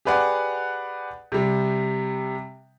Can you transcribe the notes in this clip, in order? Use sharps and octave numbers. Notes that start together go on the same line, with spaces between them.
G4 G#4 B4 D5 F#5
C3 G3